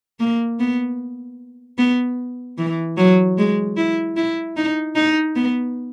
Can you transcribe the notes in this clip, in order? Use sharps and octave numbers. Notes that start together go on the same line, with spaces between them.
A#3
B3
B3
E3
F#3
G#3
E4
E4
D#4
D#4
B3